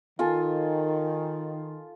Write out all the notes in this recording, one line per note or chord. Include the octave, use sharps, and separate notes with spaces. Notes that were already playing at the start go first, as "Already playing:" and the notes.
D#3 F4 A4 G#5